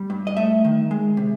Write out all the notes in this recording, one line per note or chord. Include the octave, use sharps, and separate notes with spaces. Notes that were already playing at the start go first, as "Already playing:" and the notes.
Already playing: G3
G2
D#5
A3 E5
D#3
G#3
C3